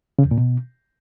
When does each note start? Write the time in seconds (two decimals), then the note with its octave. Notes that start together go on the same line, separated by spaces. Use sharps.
0.19 C#3
0.25 E2
0.31 A#2
0.38 B2